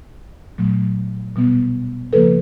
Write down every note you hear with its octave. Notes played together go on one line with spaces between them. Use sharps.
A#2 F#3 A3
B2 G3 B3
C#3 F3 A#3 A4 B4